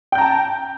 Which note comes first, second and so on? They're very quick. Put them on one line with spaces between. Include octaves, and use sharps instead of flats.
G5 G6 A#5 A5